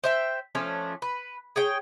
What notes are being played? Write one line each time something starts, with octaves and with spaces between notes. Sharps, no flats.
C5 E5 G5
F3 A3 C#4 D4
B4
G#4 C#5 G5